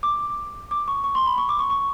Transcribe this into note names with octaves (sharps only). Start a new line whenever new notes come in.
D6
D6
C#6
C#6
C6
B5
C#6
D6
C#6
C#6